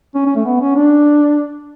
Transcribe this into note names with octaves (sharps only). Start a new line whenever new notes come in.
C#4
C#4
A3
B3
C#4
D4